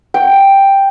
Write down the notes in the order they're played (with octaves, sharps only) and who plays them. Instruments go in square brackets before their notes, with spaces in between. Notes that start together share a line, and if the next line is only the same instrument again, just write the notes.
[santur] G5